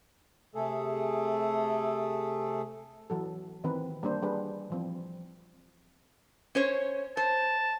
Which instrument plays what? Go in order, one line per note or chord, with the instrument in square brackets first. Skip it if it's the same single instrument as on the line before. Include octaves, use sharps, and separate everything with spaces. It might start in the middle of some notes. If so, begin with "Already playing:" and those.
[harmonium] C3 A3 G#4 A4
[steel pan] E3 F#3 A4
D#3 E3 C4 B4
G3 A#3 D4 C5
G3 D4 G#4 B4
E3 F3 C4
[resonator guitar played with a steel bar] C#4 C5 C#5
[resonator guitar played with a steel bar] C5 [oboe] A5